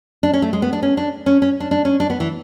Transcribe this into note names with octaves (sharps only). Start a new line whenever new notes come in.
D4
C#4
A3
G#3
B3
D4
C#4
D4
C#4
C#4
D4
D4
C#4
D4
B3
E3